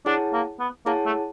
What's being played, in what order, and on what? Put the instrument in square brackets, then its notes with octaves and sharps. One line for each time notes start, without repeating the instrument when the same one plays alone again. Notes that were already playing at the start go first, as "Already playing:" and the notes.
[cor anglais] D4 [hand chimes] E4 G#4 C#5 F#5 A5
[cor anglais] A#3
B3
[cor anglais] A#3 [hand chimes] E4 G#4 C#5 F#5 A5
[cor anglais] A3